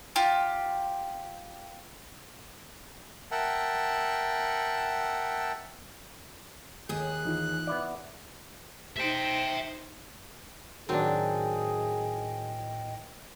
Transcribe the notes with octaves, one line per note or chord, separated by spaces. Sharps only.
F4 G4
A#4 E5 F#5 G5 A5
D#2 G#4 F#6
E3 D#4 F4
B3 E4 D5
D#4 C5 E5 G5
A2 D#3 F#3 C4 D4 G#4 D#5 G5